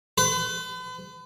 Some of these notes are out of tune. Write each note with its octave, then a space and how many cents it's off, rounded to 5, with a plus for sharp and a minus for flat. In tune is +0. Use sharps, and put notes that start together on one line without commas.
B4 +40